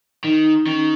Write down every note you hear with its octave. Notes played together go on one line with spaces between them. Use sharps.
D#3 D#4
D#3 C#4